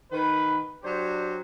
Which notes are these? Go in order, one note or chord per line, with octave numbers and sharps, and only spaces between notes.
D#3 B4
F#3 D4 G4 C5